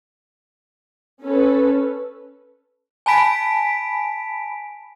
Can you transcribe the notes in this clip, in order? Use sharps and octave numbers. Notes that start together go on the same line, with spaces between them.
C#4 A4 B4
G#5 A5 B5 B6 D7